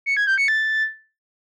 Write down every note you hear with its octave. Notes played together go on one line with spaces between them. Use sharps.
C#7
G#6
G6
C#7
A6